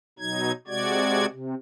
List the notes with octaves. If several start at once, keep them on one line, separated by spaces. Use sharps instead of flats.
B2 F#3 D#4 G#6
C3 G#3 F#4 D5 G#6
C3